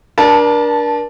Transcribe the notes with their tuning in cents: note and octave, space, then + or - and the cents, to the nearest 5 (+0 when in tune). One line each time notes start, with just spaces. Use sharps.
D4 +0 A#4 +35 A5 -10